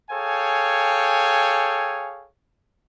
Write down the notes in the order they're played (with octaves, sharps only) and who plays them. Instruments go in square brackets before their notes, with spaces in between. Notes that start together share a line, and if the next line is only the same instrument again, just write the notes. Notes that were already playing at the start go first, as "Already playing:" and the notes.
[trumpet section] G#4 A4 C#5 F5 G5 G#5